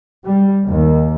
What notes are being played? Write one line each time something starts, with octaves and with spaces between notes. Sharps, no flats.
G3
D#2